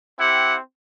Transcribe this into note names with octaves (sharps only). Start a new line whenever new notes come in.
C4 E4 G4 F#5